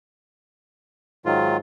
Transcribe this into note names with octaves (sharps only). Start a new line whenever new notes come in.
G#2 D#3 F#3 F4